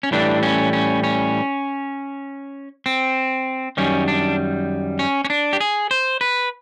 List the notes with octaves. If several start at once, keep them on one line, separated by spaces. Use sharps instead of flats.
C#4
A2 E3 G3 D4
C#4
C#4
C#4
C4
F#2 D#3 G3 C#4
D4
C#4
C#4
D4
G4
G#4
C5
B4